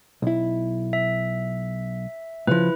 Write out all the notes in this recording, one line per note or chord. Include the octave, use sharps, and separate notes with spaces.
B1 E4
E5
A2 C#3 F3 E4 B4